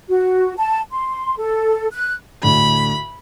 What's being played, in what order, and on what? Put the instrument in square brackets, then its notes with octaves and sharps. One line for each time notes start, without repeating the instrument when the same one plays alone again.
[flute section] F#4
A5
C6
A4
F#6
[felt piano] D2 A2 D3 [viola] B5